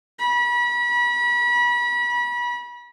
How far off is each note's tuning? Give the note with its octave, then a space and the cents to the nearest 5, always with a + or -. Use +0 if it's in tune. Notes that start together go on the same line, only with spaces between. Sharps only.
B5 -35